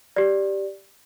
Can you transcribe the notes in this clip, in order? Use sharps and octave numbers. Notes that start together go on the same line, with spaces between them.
G4 D5